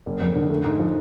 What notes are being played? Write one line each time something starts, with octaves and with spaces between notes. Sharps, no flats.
F#1
F2
D3
A3
G#2
F3